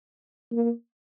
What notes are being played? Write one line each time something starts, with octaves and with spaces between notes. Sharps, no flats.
A#3